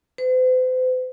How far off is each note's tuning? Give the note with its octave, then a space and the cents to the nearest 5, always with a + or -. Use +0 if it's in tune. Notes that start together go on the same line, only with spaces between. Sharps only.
C5 -45